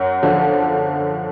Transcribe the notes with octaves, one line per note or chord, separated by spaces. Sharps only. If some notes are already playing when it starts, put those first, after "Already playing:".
Already playing: F#2 F#5
D3 F3